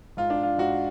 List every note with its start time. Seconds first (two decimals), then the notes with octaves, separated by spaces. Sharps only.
0.17 G#2 F4
0.30 D4
0.43 F4
0.58 G#2 F#4